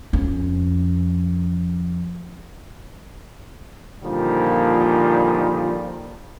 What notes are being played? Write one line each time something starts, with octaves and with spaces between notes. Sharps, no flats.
F2 C#4
A#2 D3 D#3 F3 G3